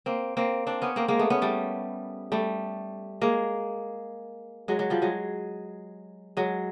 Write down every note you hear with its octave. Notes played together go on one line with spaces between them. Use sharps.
A#3 C4
A#3 C4
C4 D4
B3 C#4
A#3 C4
G#3 A#3
A3 B3
B3 C#4
G3 A3
G3 A3
G#3 A#3
F#3 G#3
F#3
F3 G3
F#3 G#3
F#3 G#3